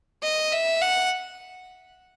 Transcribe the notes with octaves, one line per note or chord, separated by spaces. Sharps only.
D#5
E5
F#5